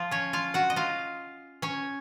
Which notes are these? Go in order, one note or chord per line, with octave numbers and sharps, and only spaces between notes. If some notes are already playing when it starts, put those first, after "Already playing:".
Already playing: F3 F4
C#4 C#5
F4 F5
F#4 F#5
D#5
F4 F5
C#4 C#5